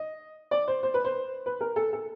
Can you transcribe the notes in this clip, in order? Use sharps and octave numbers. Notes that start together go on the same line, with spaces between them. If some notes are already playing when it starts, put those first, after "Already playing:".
Already playing: D#5
D5
C5
C5
B4
C5
B4
A#4
A4
A4